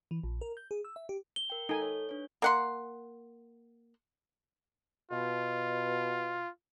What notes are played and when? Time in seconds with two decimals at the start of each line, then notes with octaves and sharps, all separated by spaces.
0.11 E3
0.23 A#1
0.41 A#4
0.57 G6
0.71 G#4
0.85 E6
0.96 E5
1.09 G4
1.36 G7
1.50 A#4 G5
1.69 D#4 A4 G#5
1.82 C#5
2.09 D4 B4 C#5
2.42 A#3 F#5 C6
5.11 B2 F4